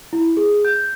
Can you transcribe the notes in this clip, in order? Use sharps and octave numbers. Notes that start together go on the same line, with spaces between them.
E4
G#4
G6